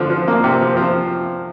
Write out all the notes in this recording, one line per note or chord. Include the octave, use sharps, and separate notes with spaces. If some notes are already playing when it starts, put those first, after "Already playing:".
Already playing: D3 F3
F3
A#3
C3
F3
F3